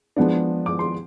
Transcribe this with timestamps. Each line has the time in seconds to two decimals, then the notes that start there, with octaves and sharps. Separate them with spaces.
0.16 F3 G#3 B3 D4
0.66 D6
0.79 C6